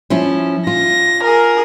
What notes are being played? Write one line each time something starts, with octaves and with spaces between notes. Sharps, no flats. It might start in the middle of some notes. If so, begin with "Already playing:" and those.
F3 C#4 E4
F4 A#6
G#4 A#4